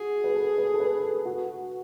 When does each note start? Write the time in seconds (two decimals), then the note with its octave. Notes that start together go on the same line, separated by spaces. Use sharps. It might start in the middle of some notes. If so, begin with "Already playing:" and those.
Already playing: F#4 G#4
0.24 B4
0.35 A4
0.58 B4
0.74 A4
0.80 B4
1.03 A4
1.25 F#4